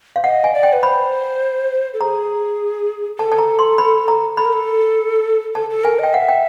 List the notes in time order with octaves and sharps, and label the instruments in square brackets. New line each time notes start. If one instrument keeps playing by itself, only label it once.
[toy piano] F5
[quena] D#5 [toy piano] F#5
[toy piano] G#5
[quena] D5
[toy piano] G5
[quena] B4
[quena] C5 [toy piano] B5
[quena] A4
[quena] G#4 [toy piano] A#5
[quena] A4 [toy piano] A5
[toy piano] A5
A#5
C6
B5
A#5
[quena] A4 [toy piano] B5
[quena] A#4
A4
[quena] A4 [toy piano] A5
[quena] A4
[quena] A#4 [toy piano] G#5
[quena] D#5 [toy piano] G5
[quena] E5 [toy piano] F#5
[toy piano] G5